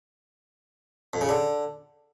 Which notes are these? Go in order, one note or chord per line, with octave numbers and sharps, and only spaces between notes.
F2
C#3
D3